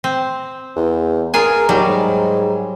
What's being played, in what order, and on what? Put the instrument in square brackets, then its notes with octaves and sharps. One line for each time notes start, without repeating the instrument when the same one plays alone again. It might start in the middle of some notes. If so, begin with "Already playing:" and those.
[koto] C4
[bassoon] E2
[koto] F4 G#4 G#5 [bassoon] A#4
[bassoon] D#2 [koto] F#3 G3
[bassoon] G#2